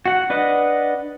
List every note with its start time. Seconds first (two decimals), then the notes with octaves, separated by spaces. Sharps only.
0.06 F#4 F#5
0.30 D4 B4 D#5 F#5